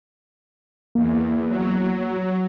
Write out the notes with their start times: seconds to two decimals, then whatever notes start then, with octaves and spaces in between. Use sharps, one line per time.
0.95 E2 A#3
1.48 F#3